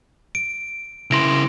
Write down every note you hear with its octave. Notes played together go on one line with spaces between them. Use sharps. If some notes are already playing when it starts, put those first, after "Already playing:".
D7
C#3 E4 C6 A#6 D7